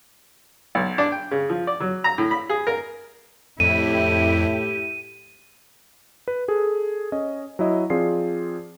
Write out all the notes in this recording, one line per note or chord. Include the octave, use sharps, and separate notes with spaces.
B1
D4
G5
C#3
F3
D5
F#3
A#5
A2
B5
G#4
A#4
F2 A2 E4 G4 D#7
B4
G#4 A4
C#4 D#5
F#3 E4 D#5
F3 C4 F4 G#4 D5 C7